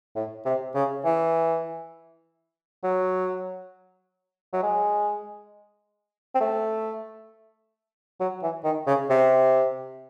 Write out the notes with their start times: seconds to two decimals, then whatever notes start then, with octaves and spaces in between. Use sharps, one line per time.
0.15 A2
0.45 C3
0.75 C#3
1.05 E3
2.84 F#3
4.53 F#3
4.63 G#3
6.35 C4
6.41 A3
8.20 F#3
8.43 E3
8.64 D#3
8.87 C#3
9.10 C3